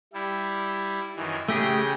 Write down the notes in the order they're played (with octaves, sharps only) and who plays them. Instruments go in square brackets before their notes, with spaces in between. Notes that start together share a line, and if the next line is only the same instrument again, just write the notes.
[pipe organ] G3 E4
F#2 D#3 E3
[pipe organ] C#3 G5 A#6 [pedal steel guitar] A3 G4 G#4